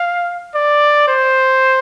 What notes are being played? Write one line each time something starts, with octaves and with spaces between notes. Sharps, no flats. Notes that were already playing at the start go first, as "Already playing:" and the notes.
Already playing: F5
D5
C5